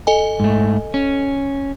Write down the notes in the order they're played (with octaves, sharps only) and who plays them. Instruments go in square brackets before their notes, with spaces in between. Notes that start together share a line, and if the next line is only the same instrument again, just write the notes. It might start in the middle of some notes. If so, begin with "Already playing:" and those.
[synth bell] A4 D#5 G#5
[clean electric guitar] G#2 A3
C#4